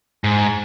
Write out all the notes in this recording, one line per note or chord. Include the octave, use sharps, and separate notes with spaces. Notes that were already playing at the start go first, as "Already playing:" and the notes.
G#2